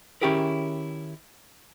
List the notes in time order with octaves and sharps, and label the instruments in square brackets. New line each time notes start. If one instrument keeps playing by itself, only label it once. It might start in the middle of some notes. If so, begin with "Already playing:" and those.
[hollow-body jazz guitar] D#3 C#4 E4 G4 G#4 A#4